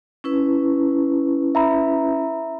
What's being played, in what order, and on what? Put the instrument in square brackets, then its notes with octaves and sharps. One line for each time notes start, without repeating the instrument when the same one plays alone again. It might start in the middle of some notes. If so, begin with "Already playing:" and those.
[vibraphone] C#4 E4 B4
[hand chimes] E5 A#5 B5